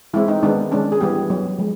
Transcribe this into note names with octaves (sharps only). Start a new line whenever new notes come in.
E3 G#3 C4 E4
D#4
D#3 G#3 B3 D4
D#3 G#3 C#4 D4
G#4
E3 G3 B3 G4
F#3 B3
F3 G#3